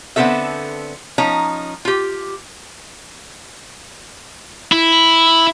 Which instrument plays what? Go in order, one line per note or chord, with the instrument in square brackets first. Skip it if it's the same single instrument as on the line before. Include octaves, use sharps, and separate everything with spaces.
[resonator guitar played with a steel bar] D3 B3 C4 F4 A4 E5
F3 C#4 D#4 A#5
F4 G4
[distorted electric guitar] E4